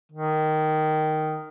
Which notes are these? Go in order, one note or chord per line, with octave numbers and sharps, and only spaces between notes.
D#3